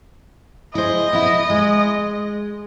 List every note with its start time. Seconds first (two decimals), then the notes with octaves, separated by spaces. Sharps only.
0.75 E4 G#4 C5 D#5
1.13 B3 E4
1.50 G#3